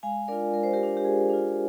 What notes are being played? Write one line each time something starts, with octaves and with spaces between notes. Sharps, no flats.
G#3 F5 G#5
D4 F4 A#4 D5
G#3 A#4
C5
G4 A#4
D4 F4
G4
G#3 G#4
D4 F4